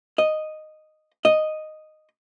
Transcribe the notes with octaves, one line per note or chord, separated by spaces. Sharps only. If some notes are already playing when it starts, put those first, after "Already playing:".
D#5
D#5